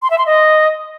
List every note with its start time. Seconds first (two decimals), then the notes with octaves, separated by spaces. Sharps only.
0.02 C6
0.10 E5
0.18 C6
0.26 D#5